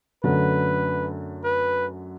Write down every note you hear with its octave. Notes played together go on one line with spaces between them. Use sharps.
F#2 D3 A3 B4
B4